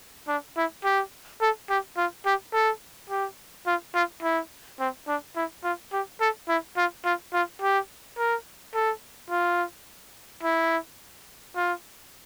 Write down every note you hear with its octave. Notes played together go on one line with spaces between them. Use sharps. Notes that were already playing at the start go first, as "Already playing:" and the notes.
D4
E4
G4
A4
G4
F4
G4
A4
G4
F4
F4
E4
C4
D4
E4
F4
G4
A4
E4
F4
F4
F4
G4
A#4
A4
F4
E4
F4